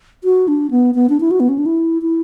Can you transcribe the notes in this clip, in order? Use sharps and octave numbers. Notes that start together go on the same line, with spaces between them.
F#4
D4
B3
B3
D4
E4
F#4
B3
C#4
D4
E4
E4